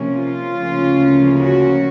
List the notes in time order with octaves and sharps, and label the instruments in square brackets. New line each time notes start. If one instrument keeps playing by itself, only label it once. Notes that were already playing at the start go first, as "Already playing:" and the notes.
Already playing: [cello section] C3 F3 A#3 C#4
F4
D2 C#3 F3 A#3 C#4
F#4